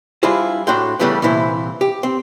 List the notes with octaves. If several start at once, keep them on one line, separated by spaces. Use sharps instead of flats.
G3 D4 E4 F4 G#4 C5
A2 D4 F#4 G5 C6
C#3 E3 G3 A3 B3 D4
C2 A#2 E3 E4 C5
G4
C4